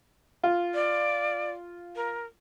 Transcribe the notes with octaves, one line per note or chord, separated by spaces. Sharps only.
F4
D5
A#4